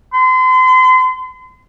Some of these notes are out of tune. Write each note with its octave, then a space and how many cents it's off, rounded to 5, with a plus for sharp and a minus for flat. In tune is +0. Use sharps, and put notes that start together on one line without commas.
C6 -35